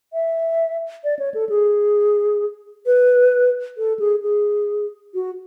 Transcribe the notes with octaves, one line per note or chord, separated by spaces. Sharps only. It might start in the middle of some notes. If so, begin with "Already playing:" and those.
E5
D5
C#5
A4
G#4
B4
A4
G#4
G#4
F#4